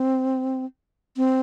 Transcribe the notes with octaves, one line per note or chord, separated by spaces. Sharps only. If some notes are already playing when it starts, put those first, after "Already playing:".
Already playing: C4
C4